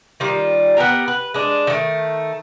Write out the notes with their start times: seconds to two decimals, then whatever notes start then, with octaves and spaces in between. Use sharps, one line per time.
0.20 D#3 G3 F4
0.77 B3 C4 G4 A#4
1.08 B4
1.34 G#3 D4
1.67 D#3 A3